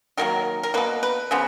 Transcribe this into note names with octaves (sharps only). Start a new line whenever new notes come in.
D#3 F#3 A#3 A#4
A#4
B2 A#3 B4
B4
C#3 F3 B3